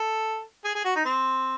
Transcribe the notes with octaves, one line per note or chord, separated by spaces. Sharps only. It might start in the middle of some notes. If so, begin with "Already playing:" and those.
Already playing: A4
G#4
G#4
F#4
D#4
C4